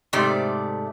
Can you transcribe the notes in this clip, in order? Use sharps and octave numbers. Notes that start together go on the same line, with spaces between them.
G#2 C3 A3 G4 D5